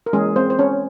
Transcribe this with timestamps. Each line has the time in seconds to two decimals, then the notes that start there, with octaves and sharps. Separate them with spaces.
0.06 A#4
0.13 E3 G#3 A#3 C#4 G#4
0.36 C4 C5
0.50 C5
0.59 C#4 C#5